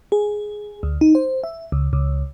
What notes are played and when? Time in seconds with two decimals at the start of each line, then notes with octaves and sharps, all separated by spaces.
0.12 G#4
0.83 D2
1.01 D#4
1.15 C5
1.44 E5
1.72 C#2
1.93 C#2